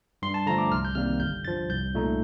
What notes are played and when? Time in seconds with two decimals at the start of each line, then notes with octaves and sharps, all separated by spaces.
0.22 G2 C6
0.34 A5
0.46 D3 F3 A3 A#5
0.58 D6
0.72 C2 F6
0.85 G6
0.95 C3 D#3 G3 A#3 F6
1.20 G1 G6
1.45 G2 F3 A6
1.69 C2 G6
1.94 A#2 A3 D#4